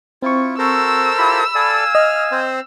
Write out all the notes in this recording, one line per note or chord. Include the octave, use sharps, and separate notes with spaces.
C4 E4 F4 C#6
F#4 A4 A#4 C5 E6
E4 F4 G4 B5
A4 D5 F5 G#5
D#5 F6
C4 C5